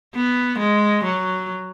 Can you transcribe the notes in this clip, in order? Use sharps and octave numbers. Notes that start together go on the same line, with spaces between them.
B3
G#3
F#3